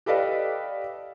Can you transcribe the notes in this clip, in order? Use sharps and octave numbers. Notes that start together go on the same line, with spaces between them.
G4 A4 B4 D5 D#5 F5